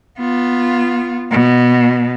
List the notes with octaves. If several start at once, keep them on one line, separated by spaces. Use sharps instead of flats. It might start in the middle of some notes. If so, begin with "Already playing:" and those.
B3 F4
B2